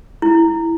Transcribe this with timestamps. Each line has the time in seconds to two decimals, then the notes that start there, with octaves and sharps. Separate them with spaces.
0.22 E4